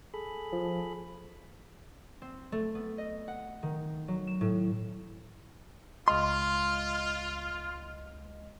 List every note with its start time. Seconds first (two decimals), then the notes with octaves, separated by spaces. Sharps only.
0.14 G#4 A4 B5
0.52 F3
2.22 C4
2.52 A3
2.75 B3
2.98 D#5
3.28 F#5
3.63 D#3
4.08 F#3
4.27 E7
4.41 A2
6.08 C#2 G#3 F4 D#5 C6 F6